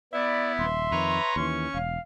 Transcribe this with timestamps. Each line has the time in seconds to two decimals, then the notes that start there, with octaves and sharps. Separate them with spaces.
0.13 B3 E4 D5 E5
0.59 D#1 C6
0.91 F2 D#3 B4 C#5 A#5
1.36 D#2 E3 C#4 C#6
1.74 E1 F5